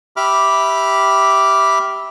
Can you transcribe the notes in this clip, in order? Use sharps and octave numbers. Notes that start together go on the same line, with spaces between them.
G4 E5 B5 D6 F6